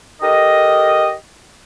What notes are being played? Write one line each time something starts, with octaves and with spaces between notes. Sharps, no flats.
G4 A4 A#4 D#5